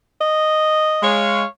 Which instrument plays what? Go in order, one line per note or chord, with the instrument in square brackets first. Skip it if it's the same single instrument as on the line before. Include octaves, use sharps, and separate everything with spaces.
[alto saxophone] D#5
[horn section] G#3 C#5 F5